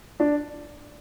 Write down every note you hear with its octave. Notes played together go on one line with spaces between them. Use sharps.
D4